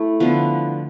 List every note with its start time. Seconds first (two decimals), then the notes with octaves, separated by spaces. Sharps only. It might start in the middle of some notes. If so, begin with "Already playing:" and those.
Already playing: A3 E4
0.20 D3 F3 B3